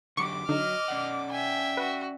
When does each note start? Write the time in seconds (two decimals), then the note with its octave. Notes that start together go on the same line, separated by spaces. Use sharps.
0.17 D3 F#3 G4 C#6 D6 C#7
0.49 D3 F#3 D#4 D#5 F6
0.88 C#4 D5 F#5
1.32 E5 G5 G#5
1.77 F#4 B4